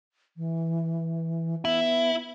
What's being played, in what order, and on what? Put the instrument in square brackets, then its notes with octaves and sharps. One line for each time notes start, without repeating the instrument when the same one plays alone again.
[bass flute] E3
[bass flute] B3 [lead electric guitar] E4